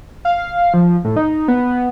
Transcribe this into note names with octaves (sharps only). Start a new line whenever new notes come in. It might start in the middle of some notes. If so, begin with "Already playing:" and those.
F5
F3
A2
D#4
B3